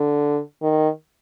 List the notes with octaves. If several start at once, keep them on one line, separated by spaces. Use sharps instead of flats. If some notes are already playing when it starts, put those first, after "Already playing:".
Already playing: D3
D#3